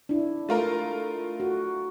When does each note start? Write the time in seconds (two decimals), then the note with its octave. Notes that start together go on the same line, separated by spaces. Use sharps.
0.09 D4 E4
0.49 A3 F4 A#4
1.40 F#4